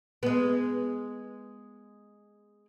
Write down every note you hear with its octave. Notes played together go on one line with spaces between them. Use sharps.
G#3 B3